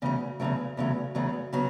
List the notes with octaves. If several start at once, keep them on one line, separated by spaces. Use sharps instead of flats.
E2 C#3 F#3 A3
E2 C#3 F#3 A3
E2 C#3 F#3 A3
E2 C#3 F#3 A3
C#3 F#3 B3